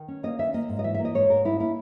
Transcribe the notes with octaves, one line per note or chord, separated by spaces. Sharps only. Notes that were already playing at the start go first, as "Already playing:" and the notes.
Already playing: D#3
C#4
A#3 D#5
D#3 E5
A#3 D#5
G#2
D#5
E3 E5
E5
A#3
D#5
G#2 C#5
G#2 A#4
D#4 E4
A#3 E4